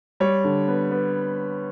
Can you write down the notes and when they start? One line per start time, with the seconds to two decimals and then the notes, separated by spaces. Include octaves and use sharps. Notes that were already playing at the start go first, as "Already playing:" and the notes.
0.20 G3 C#5
0.44 D3
0.68 B3
0.91 B3